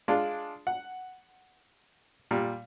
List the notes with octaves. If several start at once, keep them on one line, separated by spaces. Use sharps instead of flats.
G#3 D4 F4
F#5
A#2 G3